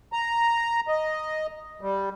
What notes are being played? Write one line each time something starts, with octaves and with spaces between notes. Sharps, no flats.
A#5
D#5
G3